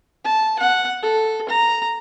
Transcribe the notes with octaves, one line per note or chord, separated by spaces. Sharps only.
A5
F#5
A4
A#5